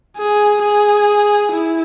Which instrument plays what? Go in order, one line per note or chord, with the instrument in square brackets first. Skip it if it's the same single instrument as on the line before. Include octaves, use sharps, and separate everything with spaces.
[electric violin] G#4
G#4
E4